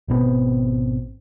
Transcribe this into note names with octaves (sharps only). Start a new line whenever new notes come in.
G#1 B2 B3 C4